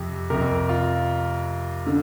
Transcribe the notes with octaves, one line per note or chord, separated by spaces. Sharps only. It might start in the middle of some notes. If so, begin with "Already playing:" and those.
Already playing: F2 C3
F2 C3 A#4
F4
D3